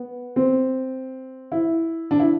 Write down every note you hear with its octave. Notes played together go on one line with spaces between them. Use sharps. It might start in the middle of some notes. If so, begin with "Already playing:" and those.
Already playing: B3
C4
E4
D4
E4